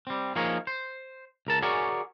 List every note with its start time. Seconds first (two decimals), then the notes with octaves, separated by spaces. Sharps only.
0.07 G3 C4
0.36 F3 A#3 D#4 G#4 A#4 C#5
0.67 C5
1.47 C#2 A#4 A5
1.62 F#4 G#4 A#4 C#5 D5 G#5